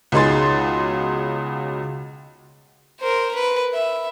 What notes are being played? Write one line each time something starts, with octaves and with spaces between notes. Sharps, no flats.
C#2 B2 D#4 G#4 C6 A6
A#4 C5
B4
E5